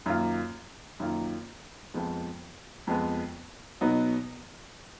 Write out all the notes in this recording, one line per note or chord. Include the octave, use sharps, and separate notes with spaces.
F#2 D#3 A#3 F4
F#2 D#3 A#3 F4
F2 F3 G#3 B3
F2 F3 G#3 B3
B2 F#3 B3 D#4